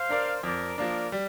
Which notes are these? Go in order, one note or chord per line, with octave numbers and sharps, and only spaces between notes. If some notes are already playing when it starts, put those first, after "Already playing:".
Already playing: C5 F5
D4 A#4 D5
F2 A#4 D5
F3 A#3 D4 A#4 D5
G3